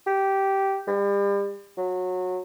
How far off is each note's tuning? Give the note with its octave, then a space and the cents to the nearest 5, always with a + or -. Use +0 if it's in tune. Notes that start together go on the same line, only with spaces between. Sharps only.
G4 -10
G3 +40
F#3 -20